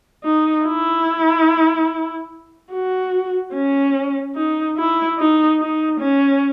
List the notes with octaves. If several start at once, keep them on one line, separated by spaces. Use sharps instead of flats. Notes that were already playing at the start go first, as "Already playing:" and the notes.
D#4
E4
F#4
C#4
D#4
E4
D#4
D#4
C#4